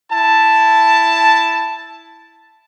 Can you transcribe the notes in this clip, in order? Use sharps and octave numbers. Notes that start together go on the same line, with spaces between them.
E4 A5